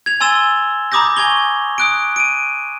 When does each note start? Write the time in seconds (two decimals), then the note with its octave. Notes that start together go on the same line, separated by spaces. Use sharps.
0.06 G#6 F7
0.20 G#5 C6 E6 A6 E7 G7
0.92 A#5 B5 D6 D#6 G6 A#6
1.17 G#5 C#6 G#6 F7 G7
1.78 D#6 F#6 D7
2.16 D7 D#7